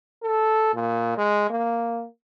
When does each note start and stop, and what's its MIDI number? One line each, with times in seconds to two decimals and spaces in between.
0.23 0.74 69
0.74 1.13 46
1.17 1.47 56
1.50 2.05 58